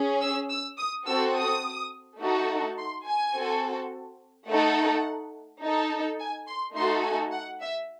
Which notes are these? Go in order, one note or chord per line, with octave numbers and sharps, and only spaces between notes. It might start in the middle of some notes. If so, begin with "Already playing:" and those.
Already playing: C#4 G#4
E6
E6
D#6
C4 F#4 A4 E6
D#6
A3 D#4 F#4 A4
C6
G#5
C4 F#4 A4
A3 D#4 A4 F#5
D#4 A4
G#5
C6
A3 D#4 F#4 A4 C6
G#5
F#5
E5